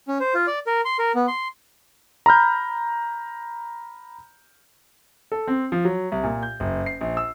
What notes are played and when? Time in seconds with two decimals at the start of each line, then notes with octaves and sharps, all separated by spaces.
0.08 C#4
0.20 C5
0.34 F4
0.47 D5
0.67 A#4
0.85 C6
0.99 A#4
1.15 B3
1.28 C6
2.26 A#5 B5 F6 G6
5.32 A4
5.48 C4
5.72 F3
5.85 F#3
6.12 C2
6.24 A#2
6.43 G6
6.60 F#1
6.86 C7
7.01 A#1
7.17 E6